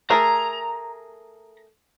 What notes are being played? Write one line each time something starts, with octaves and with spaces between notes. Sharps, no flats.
A3 G#4 A#4 A#5